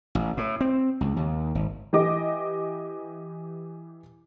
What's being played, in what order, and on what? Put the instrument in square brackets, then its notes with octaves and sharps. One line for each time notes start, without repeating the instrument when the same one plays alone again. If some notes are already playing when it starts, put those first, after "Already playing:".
[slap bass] A1
A2
C4
C#2
D#2
G#1
[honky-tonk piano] E3 G4 D#5 D6